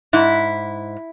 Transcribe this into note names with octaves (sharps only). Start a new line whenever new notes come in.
G#2 E4